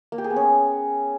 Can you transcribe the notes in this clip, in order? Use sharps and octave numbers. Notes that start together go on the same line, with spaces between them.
A#3
G4
G#4
B3
C#4